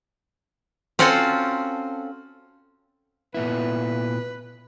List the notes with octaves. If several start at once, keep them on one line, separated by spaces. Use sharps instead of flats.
C4 C#4 F4 F#4 A4
A#2 B3 E4 B4